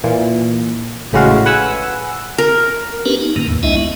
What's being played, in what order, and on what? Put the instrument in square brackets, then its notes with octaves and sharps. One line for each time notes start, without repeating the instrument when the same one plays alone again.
[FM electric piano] A#2 E3
A1 A2 C#3 G#3 F#4 F5
B4 F#5 G#5 E6
[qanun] A#4
[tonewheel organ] B3 C#4 D4 G4 A#4 B4
D#4
A2 D#3 A#3
E2
C#2 G#3 D4 E4 D#5 E5
B3